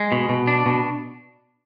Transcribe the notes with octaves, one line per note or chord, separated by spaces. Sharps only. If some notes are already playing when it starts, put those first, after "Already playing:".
Already playing: G#3
B2
B2
D4
B2